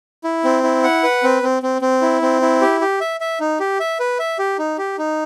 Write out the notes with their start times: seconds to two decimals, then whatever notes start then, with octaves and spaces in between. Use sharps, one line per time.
0.24 E4
0.44 C4
0.63 E4
0.83 F#5
1.03 B4
1.23 C4
1.43 C4
1.63 C4
1.82 C4
2.02 E4
2.22 C4
2.42 E4
2.61 G4
2.81 G4
3.01 E5
3.20 E5
3.40 D#4
3.60 G4
3.80 E5
4.00 B4
4.19 E5
4.39 G4
4.59 D#4
4.78 G4
4.98 D#4